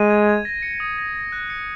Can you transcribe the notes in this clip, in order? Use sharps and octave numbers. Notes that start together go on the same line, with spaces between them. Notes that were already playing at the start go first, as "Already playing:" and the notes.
Already playing: G#3 D#7
G#6
G#6
A#6
C#7
D#6
A#6
A#6
F#6
C#7